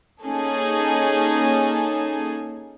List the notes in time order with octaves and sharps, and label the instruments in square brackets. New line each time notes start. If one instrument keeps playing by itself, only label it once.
[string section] A#3 C#4 D#4 G#4 A4